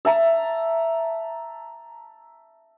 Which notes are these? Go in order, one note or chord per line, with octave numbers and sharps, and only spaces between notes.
E5 A5 A#5